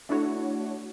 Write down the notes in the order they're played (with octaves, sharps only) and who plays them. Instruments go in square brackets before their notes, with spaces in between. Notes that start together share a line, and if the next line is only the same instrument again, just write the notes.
[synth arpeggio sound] A3 D4 E4 F#4 C#5